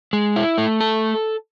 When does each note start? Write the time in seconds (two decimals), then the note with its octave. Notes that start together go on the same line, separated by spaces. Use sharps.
0.13 G#3
0.36 E4
0.58 A3
0.80 A4